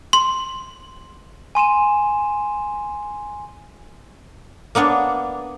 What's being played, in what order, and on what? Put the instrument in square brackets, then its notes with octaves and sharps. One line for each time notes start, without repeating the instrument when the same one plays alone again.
[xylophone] C6
[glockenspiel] G#5 C6 D#7 E7
[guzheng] A#3 B3 D4 C#5